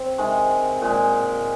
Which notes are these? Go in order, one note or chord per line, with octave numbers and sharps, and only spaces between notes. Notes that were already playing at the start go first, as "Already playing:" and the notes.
Already playing: C4
C3 D#3 G#3
A#2 G#3